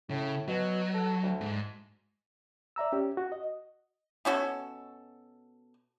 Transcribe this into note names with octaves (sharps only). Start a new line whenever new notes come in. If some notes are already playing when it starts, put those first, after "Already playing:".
A2 C#3
B2 F#3
A4
D2
G#2
D5 E5 A#5 E6
C#4 G4
F#4
D#5
B2 C#4 F#4 A4